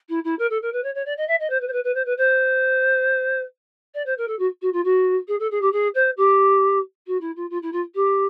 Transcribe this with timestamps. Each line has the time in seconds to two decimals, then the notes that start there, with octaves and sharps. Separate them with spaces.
0.09 E4
0.24 E4
0.39 A#4
0.50 A4
0.62 A#4
0.73 B4
0.83 C#5
0.95 C#5
1.06 D5
1.17 D#5
1.28 E5
1.40 D#5
1.50 C5
1.61 B4
1.67 C5
1.72 B4
1.84 B4
1.94 C5
2.05 B4
2.17 C5
3.94 D5
4.06 C5
4.18 A#4
4.28 A4
4.39 F#4
4.62 F#4
4.73 F4
4.84 F#4
5.28 G#4
5.39 A4
5.51 G#4
5.61 G4
5.72 G#4
5.94 C5
6.17 G4
7.07 F#4
7.21 E4
7.36 F4
7.50 F4
7.62 E4
7.72 F4
7.95 G4